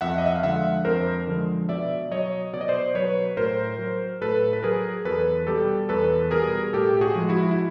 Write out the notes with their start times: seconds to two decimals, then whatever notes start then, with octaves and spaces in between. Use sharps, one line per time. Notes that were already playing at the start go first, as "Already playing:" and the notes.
0.01 F2 E5 F#5
0.18 D#5
0.26 E5
0.36 F5
0.43 D3 F3 G#3 E5 F#5
0.85 F2 A#4 C5
1.27 D3 F3 G#3
1.69 B2 D5 E5
2.11 F#3 C#5 D#5
2.53 B2 D5
2.61 D#5
2.68 C5 D5
2.95 F#3 B4 C#5
3.37 A2 A#4 C5
3.79 F#3
4.21 A2 A4 B4
4.53 B4
4.63 F#3 G#4 A#4
5.05 E2 A4 B4
5.47 B2 G3 G4 A4
5.89 E2 A4 B4
6.31 B2 G3 G#4 A#4
6.73 A2 G4 A4
6.97 G4
7.01 F#4 G#4
7.15 F3 G#3
7.29 E4 F#4
7.51 E4